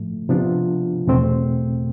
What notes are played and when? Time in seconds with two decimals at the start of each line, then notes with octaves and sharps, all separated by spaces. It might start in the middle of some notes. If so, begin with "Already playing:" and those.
Already playing: A2 F3 A3
0.29 C3 F3 B3 D4 F4
1.07 E2 B2 A3 C4